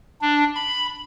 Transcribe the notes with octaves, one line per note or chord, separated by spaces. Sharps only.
D4
B5